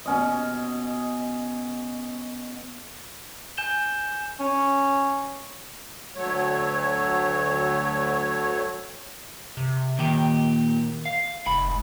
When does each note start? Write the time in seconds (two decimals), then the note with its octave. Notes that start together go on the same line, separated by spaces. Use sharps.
0.06 B2 C#4 D#5
3.57 G#5 G6 E7 G7
4.40 C#4
6.16 D2 F#3 A3 C#5
9.57 C3
9.99 D#2 A#2 D#3 G4
11.06 F5
11.47 F1 G#2 B5